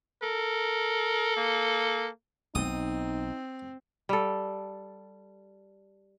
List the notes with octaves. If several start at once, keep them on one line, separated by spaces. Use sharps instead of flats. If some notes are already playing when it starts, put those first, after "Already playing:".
A4 A#4
A#3
B1 C4 D#4 D#6
G3 A4